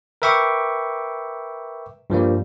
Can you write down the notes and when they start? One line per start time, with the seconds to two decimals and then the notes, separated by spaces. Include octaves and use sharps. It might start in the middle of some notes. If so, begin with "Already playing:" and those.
0.22 A#4 B4 E5 G5 C#6 D6
2.10 G2 F3 G3 A#3